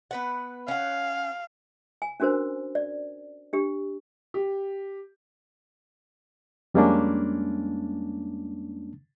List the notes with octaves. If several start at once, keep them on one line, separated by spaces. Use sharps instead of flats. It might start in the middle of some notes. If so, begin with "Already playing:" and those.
B3 B4 F#5
C#4 F5 F#5
G#5
C#4 D4 F#4 A#4 C5
D5
D4 G4
G4
F2 G3 G#3 A#3 C#4 D4